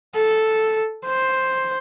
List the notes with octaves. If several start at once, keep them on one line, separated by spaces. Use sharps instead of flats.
A4
C5